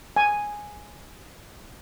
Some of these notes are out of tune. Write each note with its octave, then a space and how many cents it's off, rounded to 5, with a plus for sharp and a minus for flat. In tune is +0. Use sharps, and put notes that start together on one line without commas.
G#5 +0